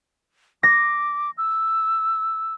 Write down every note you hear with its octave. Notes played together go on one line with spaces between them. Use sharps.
D6 A#6
E6